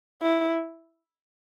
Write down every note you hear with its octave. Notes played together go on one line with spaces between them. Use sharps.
E4